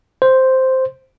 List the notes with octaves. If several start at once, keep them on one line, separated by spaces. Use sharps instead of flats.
C5